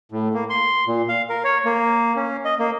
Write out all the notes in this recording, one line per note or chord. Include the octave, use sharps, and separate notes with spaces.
A2
A#3
C6
A#2
F5
A#4
C#5
A#3
C#4
D#5
A#3